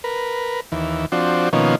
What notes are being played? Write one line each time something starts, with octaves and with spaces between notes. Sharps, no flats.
A#4 B4
D#2 E3
F3 C4 D4 F#4
B2 D#3 F3 A#3 C#4